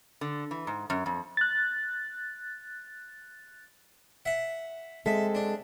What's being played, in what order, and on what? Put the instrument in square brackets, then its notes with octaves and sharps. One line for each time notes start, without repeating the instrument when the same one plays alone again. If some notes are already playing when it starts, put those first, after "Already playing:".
[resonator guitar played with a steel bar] D3
E3
G#2
F#2
F2
[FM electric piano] F#6 A6
[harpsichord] E5 F#5
[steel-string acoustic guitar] G#3 C4 A4 [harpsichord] E5
[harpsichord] D4